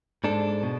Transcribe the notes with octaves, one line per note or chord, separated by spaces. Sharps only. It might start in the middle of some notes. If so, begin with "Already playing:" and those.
G#2 G#3 D4 A4
B2